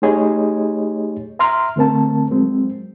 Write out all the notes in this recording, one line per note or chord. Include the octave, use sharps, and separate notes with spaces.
A3 D#4 G4 G#4 C#5 D#5
E5 A#5 C6 F6
D3 A3 C4 A#4 A5
F#3 G#3 C4